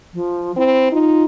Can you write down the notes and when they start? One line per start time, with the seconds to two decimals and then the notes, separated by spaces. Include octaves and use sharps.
0.14 F3
0.57 C4 E4
0.92 D#4 F4